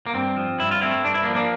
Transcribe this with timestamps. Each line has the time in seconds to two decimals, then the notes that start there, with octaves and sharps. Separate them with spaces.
0.06 A#3
0.14 G2 C4
0.37 F3
0.60 G2 E4
0.71 F4
0.81 A3 C4 E4
1.04 G2 D4
1.14 E4
1.23 A#3 D4
1.28 F3
1.35 A#3 D4